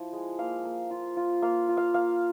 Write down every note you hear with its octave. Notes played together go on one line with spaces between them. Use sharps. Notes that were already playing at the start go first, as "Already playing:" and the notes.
Already playing: F3 E4
G#3
A#3 F5
A#3
F4
F4
A#3 F5
F4
F5
A#3 F5